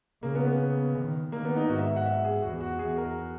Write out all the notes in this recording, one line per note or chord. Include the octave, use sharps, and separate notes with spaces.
C#3 A#3
B3
B3
D#3
D#3 A#3
B3
D#4
G#2 F#4
E5
F#5
E5
G#4
E2 F#4
F#4
E2 G#4
A#4